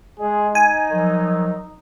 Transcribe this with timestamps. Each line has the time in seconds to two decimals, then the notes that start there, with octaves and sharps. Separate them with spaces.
0.20 G#3 G#4
0.55 D#4 G#5
0.91 D#3 F3 F#3